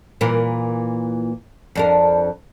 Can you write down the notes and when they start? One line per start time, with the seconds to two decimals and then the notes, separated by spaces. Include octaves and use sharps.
0.21 A#2 E3 A#4
1.75 F2 D4 A#4